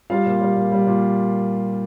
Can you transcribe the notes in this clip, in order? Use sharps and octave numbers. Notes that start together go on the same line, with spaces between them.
G3 F4 F5
A#2
G3
A#2
G3
A#2